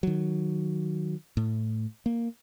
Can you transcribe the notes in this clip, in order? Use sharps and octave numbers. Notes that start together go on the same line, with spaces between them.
D#3 F#3
A2
A#3